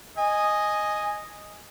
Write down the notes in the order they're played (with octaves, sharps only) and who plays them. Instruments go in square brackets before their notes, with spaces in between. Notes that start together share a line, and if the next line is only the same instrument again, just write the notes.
[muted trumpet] D#5 [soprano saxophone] G#5